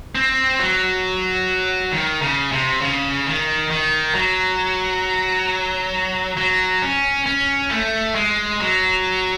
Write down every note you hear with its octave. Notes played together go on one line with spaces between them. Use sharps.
C4
F#3
D#3
C#3
C3
C#3
D#3
D#3
F#3
F#3
C#4
C#4
A3
G#3
F#3